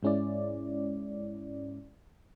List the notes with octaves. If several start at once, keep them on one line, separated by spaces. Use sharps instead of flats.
G#2 G#3 C#4 E4 D5